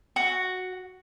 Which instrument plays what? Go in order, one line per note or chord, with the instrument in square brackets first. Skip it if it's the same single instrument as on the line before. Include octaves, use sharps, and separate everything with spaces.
[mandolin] F#4